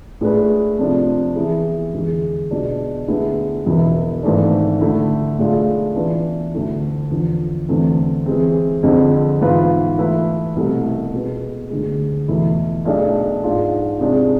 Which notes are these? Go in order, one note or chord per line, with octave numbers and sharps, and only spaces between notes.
A2 G#3 D4 G#4 B4
C3 F3 A3 D4
E3 B3 E4 G#4
E2 D3 G#3
B2 G#3 D4
D2 D3 G#3 B3 E4
E1 E2 B2 B3 E4
G#1 G#2 E3 A3 D4
D3 A3 E4
B1 A2 G#3 D4 F4
E3 B3 D4
D2 D3 A3 E4
E2 D3 F3
E2 D3 A3 C4
E3 G#3 C4
F2 D3 G#3 C4
G#2 E3 B3 F4 B4
E3 A3 E4 B4
C2 B2 A3
B2 G#3 B3
D2 D3 G#3
E2 B2 A3 E4
B1 B2 A3 D4 G#4
G#2 G#3 D4 F4
C3 G#3 D4